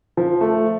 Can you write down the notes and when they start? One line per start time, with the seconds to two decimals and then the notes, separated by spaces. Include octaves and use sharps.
0.17 F3
0.41 A3